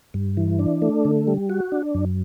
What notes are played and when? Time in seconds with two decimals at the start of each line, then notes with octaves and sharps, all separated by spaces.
0.14 G2
0.37 E3
0.59 D4
0.82 A3
1.05 D3
1.27 G3
1.49 F#4
1.72 D4
1.94 F#2